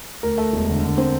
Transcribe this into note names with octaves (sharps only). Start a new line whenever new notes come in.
D2 A#4
A3
E1
D3
D3
C4